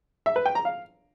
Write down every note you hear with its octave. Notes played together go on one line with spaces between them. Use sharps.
E5
B4
G5
A#5
F5